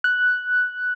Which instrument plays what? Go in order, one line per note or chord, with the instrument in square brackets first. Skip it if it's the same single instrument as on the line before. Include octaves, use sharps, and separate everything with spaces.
[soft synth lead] F#6